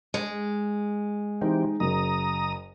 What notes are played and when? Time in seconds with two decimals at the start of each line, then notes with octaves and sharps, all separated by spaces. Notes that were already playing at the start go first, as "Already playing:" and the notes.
0.14 G#3
1.41 E3 C4 D#4 G4
1.80 F#1 A#5 D#6